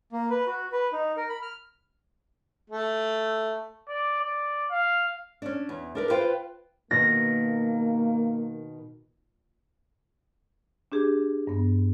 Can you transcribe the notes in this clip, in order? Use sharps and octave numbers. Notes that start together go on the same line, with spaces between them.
A#3
B4
F#4
B4
D#4
A#4
B5
F6
A3
D5
D5
F5
C#4 D4
E2
D4 A#4 B4
F4 B4 C5 F5 G5
B2 D#3 A#3 F#4 A#6
D4 G4 G#4
G2 B3